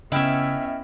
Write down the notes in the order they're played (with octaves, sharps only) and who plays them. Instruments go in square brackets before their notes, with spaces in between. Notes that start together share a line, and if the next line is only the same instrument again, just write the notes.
[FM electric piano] C#3 [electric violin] B3 C#4 [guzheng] E4 E5 [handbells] D#5 G5 F6